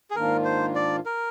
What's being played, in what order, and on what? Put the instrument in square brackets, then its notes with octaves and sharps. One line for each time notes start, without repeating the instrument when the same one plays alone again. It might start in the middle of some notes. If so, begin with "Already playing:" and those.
[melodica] G#4
[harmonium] G#2 D#3 A#3 D4 F4 [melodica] A#4
[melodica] C5
D5
A#4